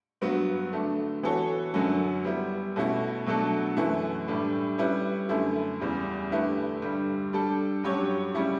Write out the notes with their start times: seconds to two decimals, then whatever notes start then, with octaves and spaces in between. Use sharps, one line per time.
0.21 G2 F#3 B3 F#4
0.72 D3 A3 D4
1.23 E3 B3 F#4 A4 C#5
1.74 F#2 D3 F#3 C#4
2.24 G3 B3 E4
2.76 B2 A3 C#4 E4
3.26 B2 F#3 A3 D4 A4
3.77 F#2 E3 A3 E4 B4
4.28 A2 G3 D4 G4
4.78 G3 C#4 E4 B4
5.29 F#2 D3 A3 E4
5.80 E2 C#3 E3 G3
6.30 D3 A3 E4 G4 B4
6.82 G2 D3 G3
7.33 G3 D4 A4
7.83 G2 F#3 C#4 G4 C#5
8.34 C#3 G3 C#4 E4